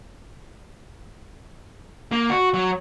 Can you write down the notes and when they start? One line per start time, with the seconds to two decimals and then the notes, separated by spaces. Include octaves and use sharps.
2.12 A#3
2.30 F#4
2.54 F#3